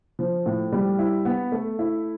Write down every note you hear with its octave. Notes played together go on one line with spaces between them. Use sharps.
F3
A2
G3
E4
B3
A3
E4